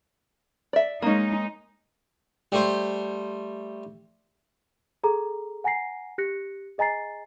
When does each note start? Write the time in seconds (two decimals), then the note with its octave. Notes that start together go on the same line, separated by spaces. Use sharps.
0.73 D5 E5
1.02 G#3 A#3 C#4 D#4
2.52 G3 A3 C5
5.04 G#4 A4 A#5
5.64 F#5 G#5 A#5 A#6 C7
6.18 G4 F#6 A#6 C#7
6.78 G#4 D#5 G#5 A#5 A6 C7